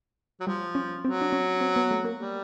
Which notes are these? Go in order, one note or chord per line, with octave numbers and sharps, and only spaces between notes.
F#3
F3 G3
C#4
F#3 C4
D4
C#4
C4
B3
A3
A#3
G3